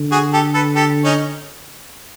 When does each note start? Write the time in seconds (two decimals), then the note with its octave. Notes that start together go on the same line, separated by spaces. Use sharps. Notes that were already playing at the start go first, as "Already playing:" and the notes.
Already playing: D3
0.12 F#4 G#4
0.33 G4 A4
0.54 A4 B4
0.76 G4 A4
1.04 C#4 D#4